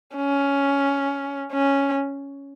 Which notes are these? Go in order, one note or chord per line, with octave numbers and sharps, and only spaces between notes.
C#4
C#4